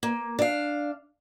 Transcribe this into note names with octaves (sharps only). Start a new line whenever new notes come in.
A#3
D4 F5